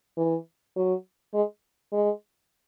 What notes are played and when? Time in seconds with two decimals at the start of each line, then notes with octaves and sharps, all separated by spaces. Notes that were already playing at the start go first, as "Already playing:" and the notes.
0.17 E3
0.76 F#3
1.34 G#3
1.92 G#3